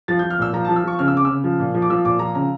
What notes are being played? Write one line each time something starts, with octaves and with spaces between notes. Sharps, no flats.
F3 A6
G6
F3
F6
A#2 E6
F3 A#5
A5
F3
E6
F3 C#6
C#3 F6
E6
C#3 D6
C#3 E6
F3
A#2
F3
D6
F3 E6
A#2 D6
F3 A#5
C#3 A#5